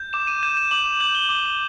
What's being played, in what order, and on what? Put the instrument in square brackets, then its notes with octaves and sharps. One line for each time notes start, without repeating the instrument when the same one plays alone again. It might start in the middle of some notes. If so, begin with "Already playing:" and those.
Already playing: [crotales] G6
D6 E7
D#7
G6 E7
E7
D6 F#7
F#7
G6 F#7
G7
D6 G7
G7